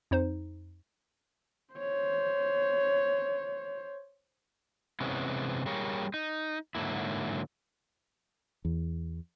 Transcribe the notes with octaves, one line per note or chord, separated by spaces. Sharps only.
F2 D#4 C5
C5 C#5
C3 E3 G#3 B3 C#4
G3 A#3 G#4 A#4 C#5
D#4
G#2 D3 F#3 A#3 E4
E2